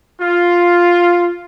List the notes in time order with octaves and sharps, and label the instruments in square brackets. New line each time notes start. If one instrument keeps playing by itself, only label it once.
[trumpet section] F4